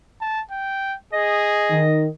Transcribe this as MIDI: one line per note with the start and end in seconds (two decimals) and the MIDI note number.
0.21 0.42 81
0.51 0.95 79
1.13 1.85 68
1.13 2.06 75
1.71 2.08 51